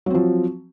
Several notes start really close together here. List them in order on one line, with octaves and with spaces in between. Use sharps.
F#3 C4 F3